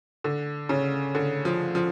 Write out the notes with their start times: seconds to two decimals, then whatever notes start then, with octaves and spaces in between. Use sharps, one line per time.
0.24 D3
0.69 C#3
1.15 D3
1.45 F3
1.75 F3